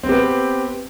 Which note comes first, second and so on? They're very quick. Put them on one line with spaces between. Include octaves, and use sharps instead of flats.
C4 B3 G4 B4